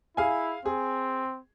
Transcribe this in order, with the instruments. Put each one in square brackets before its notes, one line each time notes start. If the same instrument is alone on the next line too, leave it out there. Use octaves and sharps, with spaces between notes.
[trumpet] E4 [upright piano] G#4 F5 G#5
[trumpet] C4 [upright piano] G#4